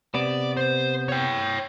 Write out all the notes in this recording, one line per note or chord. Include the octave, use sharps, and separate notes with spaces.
C3 B3 D5
C5
C#5 G5